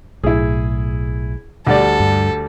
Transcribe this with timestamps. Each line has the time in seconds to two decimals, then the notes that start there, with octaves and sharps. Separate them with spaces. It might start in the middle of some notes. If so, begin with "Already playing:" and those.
0.23 B1 A2 E4 G#4
1.67 D2 G3 A4 D5
2.00 G2